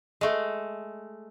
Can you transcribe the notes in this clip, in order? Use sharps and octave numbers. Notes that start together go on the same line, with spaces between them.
G#3 A3